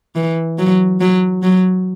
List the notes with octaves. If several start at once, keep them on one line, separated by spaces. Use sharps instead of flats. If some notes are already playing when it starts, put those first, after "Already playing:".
E3
F#3
F#3
F#3